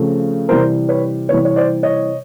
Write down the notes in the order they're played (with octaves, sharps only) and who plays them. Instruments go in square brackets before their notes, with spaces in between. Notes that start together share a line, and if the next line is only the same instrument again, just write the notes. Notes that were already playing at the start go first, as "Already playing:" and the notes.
Already playing: [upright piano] C#3 F3 A3 C4
C3 E3 G3 A#4 C5
B4 C#5
C3 E3 G3 B4 C#5
C#5
C5 D5
C#5 D#5